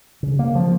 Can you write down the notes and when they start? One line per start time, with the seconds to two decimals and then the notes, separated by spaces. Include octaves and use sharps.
0.23 C#3
0.39 A#3
0.55 F3